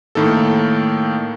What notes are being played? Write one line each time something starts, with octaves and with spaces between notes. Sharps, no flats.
A2 D#3 A#3 A4